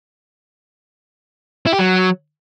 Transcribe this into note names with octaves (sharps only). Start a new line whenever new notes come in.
E4
G4
F#3